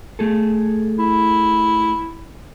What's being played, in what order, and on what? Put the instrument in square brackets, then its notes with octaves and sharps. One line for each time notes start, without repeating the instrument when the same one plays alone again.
[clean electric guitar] A3 G#4 A4
[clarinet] E4